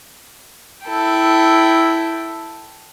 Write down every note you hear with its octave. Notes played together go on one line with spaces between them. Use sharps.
E4 A4 G5